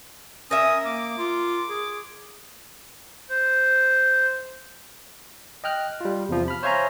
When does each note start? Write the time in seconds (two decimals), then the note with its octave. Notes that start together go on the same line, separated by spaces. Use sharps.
0.51 C#4 A#4 E5 D#6
0.85 A#3 D6
1.17 F4
1.69 G#4
3.30 C5
5.64 D#5 G5 F6 F#6
6.01 G3 F4
6.29 E2 C3 F3
6.48 B5 F6
6.63 C5 C#5 E5 F5 G#5 A#5